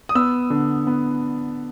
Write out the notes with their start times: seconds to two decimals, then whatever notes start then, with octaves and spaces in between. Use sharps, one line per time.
0.09 D#6
0.15 B3 E6
0.50 D3
0.87 B3